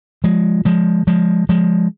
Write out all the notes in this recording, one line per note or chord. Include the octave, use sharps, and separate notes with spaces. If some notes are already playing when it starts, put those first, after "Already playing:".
F3 G#3
F3 G#3
F3 G#3
F3 G#3